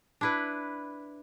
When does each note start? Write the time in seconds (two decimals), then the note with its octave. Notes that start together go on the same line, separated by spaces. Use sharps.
0.21 D4 E4 B4